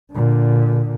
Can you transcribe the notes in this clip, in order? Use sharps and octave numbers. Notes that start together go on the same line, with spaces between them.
A#2 D3